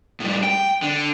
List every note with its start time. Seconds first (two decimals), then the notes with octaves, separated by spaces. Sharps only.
0.20 A2 G3
0.44 G5
0.82 D3